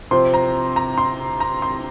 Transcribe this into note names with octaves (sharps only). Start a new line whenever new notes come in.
C3 F3 C4 C6
A#5
A#5
C6
A#5
C6